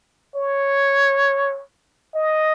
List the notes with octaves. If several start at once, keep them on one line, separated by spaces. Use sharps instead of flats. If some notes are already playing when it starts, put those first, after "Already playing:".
C#5
D#5